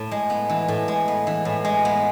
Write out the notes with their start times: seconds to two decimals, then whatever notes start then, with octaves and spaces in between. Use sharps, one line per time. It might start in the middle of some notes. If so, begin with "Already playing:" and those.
Already playing: A2
0.11 G#3
0.30 B3
0.49 E3
0.68 A2
0.88 G#3
1.08 B3
1.27 E3
1.45 A2
1.65 G#3
1.85 B3